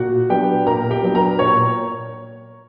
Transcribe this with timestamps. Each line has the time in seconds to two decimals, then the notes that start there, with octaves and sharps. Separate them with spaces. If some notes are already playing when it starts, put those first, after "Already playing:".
Already playing: A#2 F#4 F#5
0.30 F#3 B3 D4 G4 G5
0.66 A#2 A#4 A#5
0.91 G4 G5
1.03 F#3 B3 D4
1.15 A#4 A#5
1.39 A#2 C#5 C#6